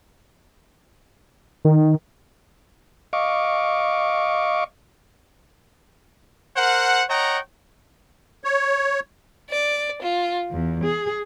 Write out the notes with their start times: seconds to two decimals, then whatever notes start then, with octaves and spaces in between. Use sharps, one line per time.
1.65 D#3
3.13 D#5 F5 C#6 D6
6.57 A#4 C5 F#5
7.10 C#5 D#5 F#5 G5 A#5
8.44 C#5
9.49 D5
10.01 F4
10.50 E2
10.82 G#4